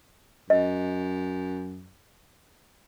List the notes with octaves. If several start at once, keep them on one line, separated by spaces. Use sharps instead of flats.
F#2 D#5